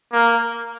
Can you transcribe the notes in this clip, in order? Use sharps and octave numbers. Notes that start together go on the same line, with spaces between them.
A#3